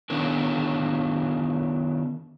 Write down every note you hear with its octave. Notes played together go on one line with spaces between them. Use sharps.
D#3 B3 C#4 D4 A#4